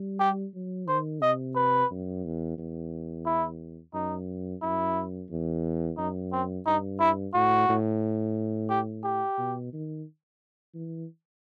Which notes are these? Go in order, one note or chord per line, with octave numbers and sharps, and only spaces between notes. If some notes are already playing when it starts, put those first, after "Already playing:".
Already playing: G3
G4
F#3
D#3 C5
C3 D#5
B4
F#2
E2
E2
E4
F#2 D#4
F#2 E4
E2
F#2 D#4
C4
G2 D#4
E4
A2 F#4
A2
G4
G4
B2
D#3
E3